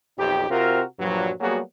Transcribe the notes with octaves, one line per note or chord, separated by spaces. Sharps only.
B1 F2 D#4 G4
C3 C4 F4 F#4 A#4
G2 A#2 F3 F#3
F#3 G3 A#3 B3 F#4 G#4